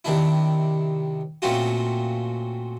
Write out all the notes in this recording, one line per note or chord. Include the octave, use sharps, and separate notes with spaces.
C3 D#3 D4 E4
A#2 A3 C4 C#4 F4 F#4